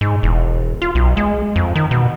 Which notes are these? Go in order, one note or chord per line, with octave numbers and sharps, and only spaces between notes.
G#2
E1
F4
B1
G#3
F2
D#3
B2